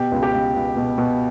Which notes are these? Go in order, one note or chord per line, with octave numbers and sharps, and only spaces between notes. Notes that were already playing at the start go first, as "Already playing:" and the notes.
Already playing: B2 G4
C#2
G4
C#2
C#2
B2
B2